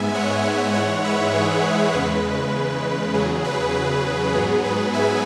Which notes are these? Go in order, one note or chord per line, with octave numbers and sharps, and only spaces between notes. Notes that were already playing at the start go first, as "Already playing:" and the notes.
Already playing: G#2 G#3 B3 E5 G#5
C#5 F#5
G#2 E3 G#3 C#5 F#5
B4 E5
G#4 C#5
E2 C#3 G#3 B4
E2 C#3 F#3 G#4
B4
G#2 F#3 B3 G#4
B4
E5 G#5